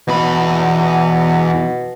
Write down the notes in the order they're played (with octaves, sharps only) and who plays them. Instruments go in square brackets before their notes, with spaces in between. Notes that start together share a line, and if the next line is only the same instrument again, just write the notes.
[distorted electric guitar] E2 B5 [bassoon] B2